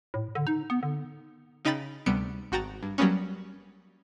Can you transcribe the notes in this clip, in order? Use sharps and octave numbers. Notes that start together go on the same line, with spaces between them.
A2
D3
D#4
B3
D3
C#3 D#4 D#5 G5 B5 A6
D2 C3 G3 B3 C#7 D7
G#1 F#4 G5 A#5 A6
G2
F#3 G3 A#3 B3 C#4